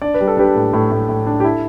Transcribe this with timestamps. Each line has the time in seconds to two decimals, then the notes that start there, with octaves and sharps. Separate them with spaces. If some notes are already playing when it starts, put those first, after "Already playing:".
0.02 D4 D5
0.14 B4
0.20 G3
0.27 A4
0.37 D4 G4 B4
0.55 A2
0.73 A2
0.92 A2
1.09 A2
1.27 D4
1.40 G4
1.44 E4 A4